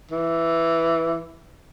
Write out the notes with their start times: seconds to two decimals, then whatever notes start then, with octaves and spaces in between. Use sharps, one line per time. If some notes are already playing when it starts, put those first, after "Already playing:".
0.11 E3